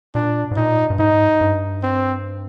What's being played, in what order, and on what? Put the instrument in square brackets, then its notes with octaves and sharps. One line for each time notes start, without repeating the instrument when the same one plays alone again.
[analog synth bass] A#2 [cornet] D4
[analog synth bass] G#2
[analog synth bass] A#2 [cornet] D#4
[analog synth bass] G2
[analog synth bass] G#2 [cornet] D#4
[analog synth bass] G2
[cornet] C4